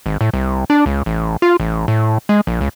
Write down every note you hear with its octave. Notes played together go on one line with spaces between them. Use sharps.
G#1
A2
C2
D4
C#2
A1
F4
A1
A2
G#3
A#1
C#2